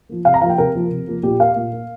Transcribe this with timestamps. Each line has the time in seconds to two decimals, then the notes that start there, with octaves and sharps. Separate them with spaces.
0.09 F3 A#3
0.25 C3 F5
0.34 A#5
0.41 F3 F5
0.46 A#3 G5
0.58 C3 A#4
0.74 F3 A#3
0.91 C3
1.07 F3 A#3
1.23 A#2 G4
1.40 A#3 F5
1.56 A#2
1.72 A#3